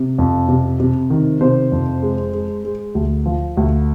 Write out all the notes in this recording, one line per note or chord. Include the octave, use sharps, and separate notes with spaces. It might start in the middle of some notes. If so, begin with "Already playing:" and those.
Already playing: C3
F2
C3
C3
D#3
C3 C5
F2
G#3
G#3
G#3
D2
F3
D2